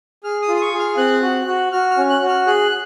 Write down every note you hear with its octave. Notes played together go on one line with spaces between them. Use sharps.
G#4 F6
D#6
F4
D#6
C#6
G#4
F6
C4 F#6
F#4
F#4
F#4 F6
F6
C#4
F#6
F#4
F6
G#4 F#6